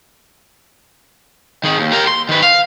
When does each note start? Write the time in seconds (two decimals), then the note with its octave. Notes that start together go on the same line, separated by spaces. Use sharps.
1.64 D#3 G#4
1.80 D#2
1.92 G4 A#4
2.07 C6
2.29 D#3 B4
2.43 F5